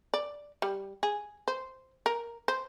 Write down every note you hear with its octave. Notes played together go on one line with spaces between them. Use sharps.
D5
G3
G#4
C5
A#4
C5